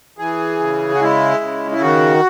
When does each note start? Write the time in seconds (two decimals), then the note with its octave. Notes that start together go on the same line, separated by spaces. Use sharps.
0.19 E3 G#4
0.60 C#3
0.95 F#4
1.01 G#3 E4
1.41 C#3
1.71 E4
1.81 D#3 F#4